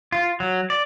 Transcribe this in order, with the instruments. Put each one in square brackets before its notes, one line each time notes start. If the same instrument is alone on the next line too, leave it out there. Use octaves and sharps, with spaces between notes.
[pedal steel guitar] F4
F#3
D5